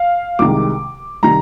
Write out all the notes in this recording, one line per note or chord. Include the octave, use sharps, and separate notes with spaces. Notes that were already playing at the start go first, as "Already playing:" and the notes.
Already playing: F5
C2 C3 D#3 G#3 D6
C3 D#3 G3 A#5